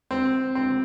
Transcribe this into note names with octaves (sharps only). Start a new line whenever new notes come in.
C4
C4